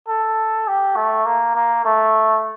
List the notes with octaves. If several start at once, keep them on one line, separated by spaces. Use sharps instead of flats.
A4
G4
A3
A#3
A#3
A3